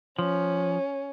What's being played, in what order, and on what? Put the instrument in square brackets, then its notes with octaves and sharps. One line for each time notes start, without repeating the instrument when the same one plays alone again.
[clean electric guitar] F3 [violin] C#4